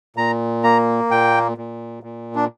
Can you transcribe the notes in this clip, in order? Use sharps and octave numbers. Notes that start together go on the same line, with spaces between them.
A#2 A#5
A#3 A#5
A#2 G5
A#2
A#2
D4